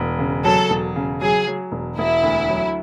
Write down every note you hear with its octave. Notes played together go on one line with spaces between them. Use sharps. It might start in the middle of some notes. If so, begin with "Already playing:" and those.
Already playing: E1
C#3
F#3 A4
E1
C#3
F#3 G#4
F#3
E1
E1 E4
D2
F#3